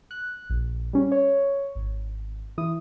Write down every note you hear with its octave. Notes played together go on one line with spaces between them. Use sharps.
F#6
A#1
G3 C#4
C#5
G#1
E3 E4 D#6